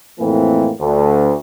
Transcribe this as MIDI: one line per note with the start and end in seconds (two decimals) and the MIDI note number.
0.19 0.71 41
0.19 0.71 45
0.19 0.71 52
0.19 0.71 58
0.19 0.71 60
0.80 1.34 38